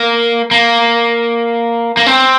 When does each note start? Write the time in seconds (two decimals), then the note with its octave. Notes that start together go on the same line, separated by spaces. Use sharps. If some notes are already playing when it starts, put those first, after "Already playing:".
Already playing: A#3
0.51 A#3
1.97 A#3
2.06 C4